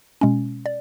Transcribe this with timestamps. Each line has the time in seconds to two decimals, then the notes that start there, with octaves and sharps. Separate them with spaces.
0.21 B2 G#3 C#4
0.66 D5